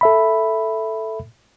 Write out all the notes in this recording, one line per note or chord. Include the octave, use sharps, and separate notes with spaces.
A4 E5 B5